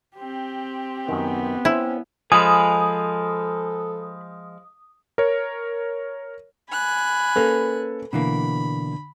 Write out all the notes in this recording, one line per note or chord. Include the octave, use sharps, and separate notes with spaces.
C4 G4
F#2 D#3 B3
C4 C#4 E4
F3 G#3 A4 G#5 B5 D#6
A#4 C#5
G#5 B5 F#6
A#3 C#4 A4 B4
B2 D3 E3 A#3 B5